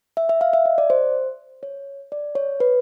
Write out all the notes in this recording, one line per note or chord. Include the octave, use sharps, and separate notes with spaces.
E5
E5
F5
E5
D#5
D5
C5
C#5
D5
C#5
B4